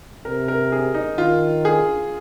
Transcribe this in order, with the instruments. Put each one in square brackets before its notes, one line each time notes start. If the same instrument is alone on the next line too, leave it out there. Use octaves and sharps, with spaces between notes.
[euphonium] C3 [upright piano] A#4
[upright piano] A#4
G#4
D#4
[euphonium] D#3 [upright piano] F4
[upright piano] G#4